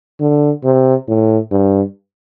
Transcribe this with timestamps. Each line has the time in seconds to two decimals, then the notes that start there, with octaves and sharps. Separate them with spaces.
0.21 D3
0.64 C3
1.08 A2
1.51 G2